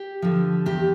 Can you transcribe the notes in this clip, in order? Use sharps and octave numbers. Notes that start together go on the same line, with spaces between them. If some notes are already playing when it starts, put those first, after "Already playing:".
Already playing: G4
D3 F3
E2 G4